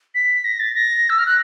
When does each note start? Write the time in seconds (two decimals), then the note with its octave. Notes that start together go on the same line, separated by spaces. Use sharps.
0.15 B6
0.44 A#6
0.60 A6
0.75 A#6
1.10 E6
1.18 F6
1.26 F#6